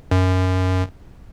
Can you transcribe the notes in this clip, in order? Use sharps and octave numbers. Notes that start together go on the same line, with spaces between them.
F#2